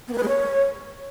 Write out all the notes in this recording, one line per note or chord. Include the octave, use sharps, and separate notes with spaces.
B3
A#3
B4
G#3
C#5